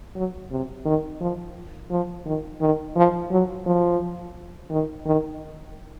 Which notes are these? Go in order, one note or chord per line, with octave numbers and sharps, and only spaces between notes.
F#3
C3
D#3
F3
F3
D#3
D#3
F3
F#3
F3
D#3
D#3